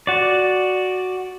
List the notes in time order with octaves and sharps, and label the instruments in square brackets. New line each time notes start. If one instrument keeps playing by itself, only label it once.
[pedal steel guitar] F#4 D5